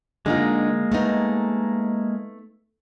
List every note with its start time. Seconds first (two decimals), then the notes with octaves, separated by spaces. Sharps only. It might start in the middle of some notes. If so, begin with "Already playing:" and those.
0.26 D3 G#3 A#3 D#4 F4
0.92 A3 B3 D#4